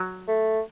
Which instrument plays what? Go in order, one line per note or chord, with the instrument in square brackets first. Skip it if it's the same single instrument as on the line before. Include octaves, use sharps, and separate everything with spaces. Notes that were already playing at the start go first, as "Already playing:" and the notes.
Already playing: [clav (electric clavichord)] F#3
[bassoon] A3